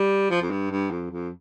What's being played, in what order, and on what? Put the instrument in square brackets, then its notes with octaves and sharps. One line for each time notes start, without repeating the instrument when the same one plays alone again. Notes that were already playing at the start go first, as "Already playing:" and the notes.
Already playing: [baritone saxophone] G3
F3
F2
G2
G2
F2
F2